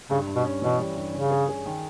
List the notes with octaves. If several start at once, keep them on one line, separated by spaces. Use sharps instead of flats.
G2 C#3
G2
B2
C#4
B2 E3
G3
G2
C#3 C#4
G#4
G#4
D#3